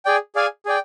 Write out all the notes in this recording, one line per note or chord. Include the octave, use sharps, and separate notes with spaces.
G#4 D5 G5
G#4 D5 F5 G#5
G#4 D5 G5